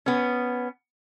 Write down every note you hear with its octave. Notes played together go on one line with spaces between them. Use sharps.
B3 C#4